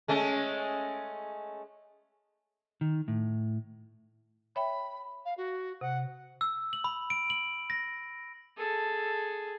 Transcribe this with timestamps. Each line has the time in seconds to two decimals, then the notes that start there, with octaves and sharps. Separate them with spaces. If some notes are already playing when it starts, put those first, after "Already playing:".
0.08 G#3 A3 C#4
2.81 D#3
3.08 A2
4.56 C#5 E5 G5 B5
5.25 F5
5.38 F#4
5.81 C3 F#5
6.41 E6
6.73 F#7
6.84 B5
7.10 D7
7.30 F#7
7.70 A#6
8.57 G#4 A4